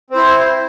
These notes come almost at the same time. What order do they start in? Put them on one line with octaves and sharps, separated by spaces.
C4 C5 E4